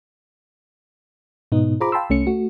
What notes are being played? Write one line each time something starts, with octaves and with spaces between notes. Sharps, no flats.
G#2 B2 B3 D#4
F4 G#4 C5 A#5 B5 D6
F5 G5 A5 B5 C6 E6
C2 A3 C#4 C#7
A3 F#4